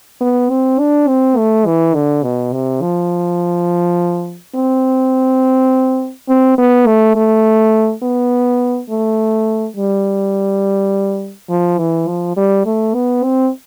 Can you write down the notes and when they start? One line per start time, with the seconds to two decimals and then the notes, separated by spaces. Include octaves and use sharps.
0.21 B3
0.50 C4
0.79 D4
1.08 C4
1.37 A3
1.66 E3
1.95 D3
2.23 B2
2.53 C3
2.82 F3
4.55 C4
6.29 C4
6.58 B3
6.87 A3
7.16 A3
8.03 B3
8.90 A3
9.76 G3
11.50 F3
11.79 E3
12.08 F3
12.37 G3
12.66 A3
12.94 B3
13.24 C4